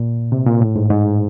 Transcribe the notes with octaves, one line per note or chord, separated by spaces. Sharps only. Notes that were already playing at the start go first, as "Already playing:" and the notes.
Already playing: A#2
C3
A#2
A2
G#2
G#2